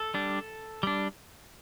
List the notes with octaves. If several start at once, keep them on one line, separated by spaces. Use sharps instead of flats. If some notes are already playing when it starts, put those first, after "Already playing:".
Already playing: A4
G3 D4
G3 D4